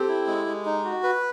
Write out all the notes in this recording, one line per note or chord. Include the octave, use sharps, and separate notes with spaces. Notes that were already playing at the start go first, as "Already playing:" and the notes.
Already playing: C4 G4 A4
E4
G#3
G#3
D#4
F#4
B4